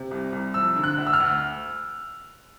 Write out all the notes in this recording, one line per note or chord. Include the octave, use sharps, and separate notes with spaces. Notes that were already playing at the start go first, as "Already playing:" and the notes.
Already playing: C3
C2
C2
F3 E6
D3
F#6
D2
E6
F6
D2